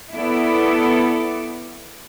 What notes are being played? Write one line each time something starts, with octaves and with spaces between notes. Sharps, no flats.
B3 E4 A4 D5